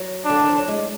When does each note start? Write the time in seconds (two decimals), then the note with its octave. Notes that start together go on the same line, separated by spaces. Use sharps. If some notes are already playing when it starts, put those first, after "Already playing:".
Already playing: F#3
0.25 D3 D4
0.39 D#3
0.49 F3
0.58 F#3
0.68 G#3